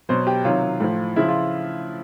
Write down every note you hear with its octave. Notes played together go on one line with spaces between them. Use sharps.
B2 F#3 C5
G4
C3 D#3 F#3 F4
A2 F3
C#3 F3 E4
F4